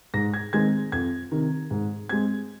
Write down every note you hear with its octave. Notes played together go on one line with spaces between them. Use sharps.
G#2 A#6
G#6
D#3 G#3 C4 G#6
F2 G#6
C3 D#3
G#2
G#3 C4 G#6